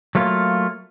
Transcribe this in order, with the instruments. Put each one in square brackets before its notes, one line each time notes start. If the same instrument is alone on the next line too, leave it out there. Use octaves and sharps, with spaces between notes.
[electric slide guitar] F#3 A3 A#3 F4